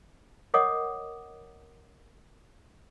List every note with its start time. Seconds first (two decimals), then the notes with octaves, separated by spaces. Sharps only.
0.54 A#4 C#5 D#5 F#5 D6 D#6